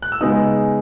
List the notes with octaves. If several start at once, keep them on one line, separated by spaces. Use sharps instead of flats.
F#6
E6
C#3 G#3 B3 D#4 D#6